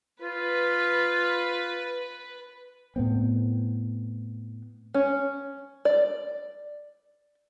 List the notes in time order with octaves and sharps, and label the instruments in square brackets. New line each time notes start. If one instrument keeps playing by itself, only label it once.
[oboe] F4 [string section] B4
[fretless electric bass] A2 B3 C4
[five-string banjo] C#4
D5